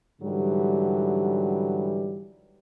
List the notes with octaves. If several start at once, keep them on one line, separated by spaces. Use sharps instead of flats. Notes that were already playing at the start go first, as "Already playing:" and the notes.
G#2 D3 E3 F#3 G3